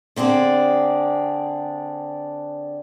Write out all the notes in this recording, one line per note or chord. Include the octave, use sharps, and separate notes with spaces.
D3 C4 D4 G#4